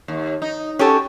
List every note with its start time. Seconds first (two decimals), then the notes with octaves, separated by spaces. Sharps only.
0.08 D#2
0.42 D#4
0.79 C#4 F#4 G4 A4 C#5